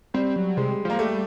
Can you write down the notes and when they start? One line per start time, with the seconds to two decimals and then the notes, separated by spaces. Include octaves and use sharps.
0.14 G3 C4
0.36 F#3
0.57 C3 G#3
0.85 F3 A#3
0.99 G3 A3